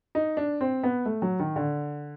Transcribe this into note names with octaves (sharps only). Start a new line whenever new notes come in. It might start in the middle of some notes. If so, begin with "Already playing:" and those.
D#4
D4
C4
B3
A3
F#3
D#3
D3